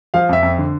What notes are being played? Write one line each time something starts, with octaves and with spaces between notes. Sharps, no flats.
F3 F5
F2 E5
F2
D3